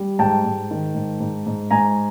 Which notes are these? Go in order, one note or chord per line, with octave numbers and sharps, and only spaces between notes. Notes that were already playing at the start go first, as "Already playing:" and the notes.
Already playing: G3
G#2 G5 A5
G#2
D#3
G#2
G#2
G#2
G#2 G#5 A#5